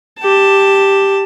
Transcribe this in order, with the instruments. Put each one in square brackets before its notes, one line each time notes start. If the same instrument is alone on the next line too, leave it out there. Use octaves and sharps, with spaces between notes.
[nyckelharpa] G4 A5